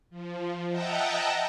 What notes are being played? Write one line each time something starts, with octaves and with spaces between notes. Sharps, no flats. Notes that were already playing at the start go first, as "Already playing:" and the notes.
F3
D#5 E5 F#5 G5 A5 A#5